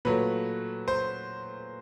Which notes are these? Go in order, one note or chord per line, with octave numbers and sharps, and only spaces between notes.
A#2 F#3 A3 B4
C5